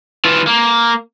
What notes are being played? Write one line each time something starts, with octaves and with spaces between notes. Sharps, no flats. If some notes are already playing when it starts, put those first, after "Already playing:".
E3 F4
A#3